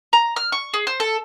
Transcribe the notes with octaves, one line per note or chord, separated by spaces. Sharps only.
A#5
F6
C#6
G#4
C5
A4